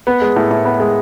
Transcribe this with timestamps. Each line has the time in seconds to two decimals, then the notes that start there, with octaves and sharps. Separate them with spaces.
0.07 B3
0.21 G#3
0.36 A2
0.51 A2
0.65 B3
0.80 G#3